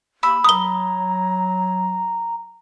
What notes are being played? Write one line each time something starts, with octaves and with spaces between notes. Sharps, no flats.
A#3 G4 B5 E6
F#3 A#5 D#6 G7